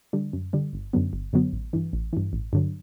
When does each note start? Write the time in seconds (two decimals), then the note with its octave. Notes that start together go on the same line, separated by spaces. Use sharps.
0.13 D3 G3
0.33 F#2
0.53 D3 G3
0.73 G1
0.93 F#2 D3 F#3 B3
1.13 G1
1.33 F#2 D3 F#3 B3
1.53 A1
1.73 G2 E3
1.93 A1
2.13 G2 E3
2.33 A1
2.53 G2 D3 F#3